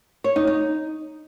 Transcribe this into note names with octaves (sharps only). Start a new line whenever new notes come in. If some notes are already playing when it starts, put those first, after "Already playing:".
C#5
D#4
D#4